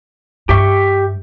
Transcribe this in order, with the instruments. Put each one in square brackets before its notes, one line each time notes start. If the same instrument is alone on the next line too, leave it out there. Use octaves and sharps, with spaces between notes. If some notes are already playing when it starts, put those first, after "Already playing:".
[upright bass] G2 [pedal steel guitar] G4 E5 C#6